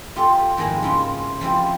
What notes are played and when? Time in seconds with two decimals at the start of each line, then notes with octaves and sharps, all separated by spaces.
0.16 F4 G4 A4
0.57 F2 G#2 D#3 G#3 A#3 E4
0.82 C#3 E4 F4
1.41 F3 G3 C4 E4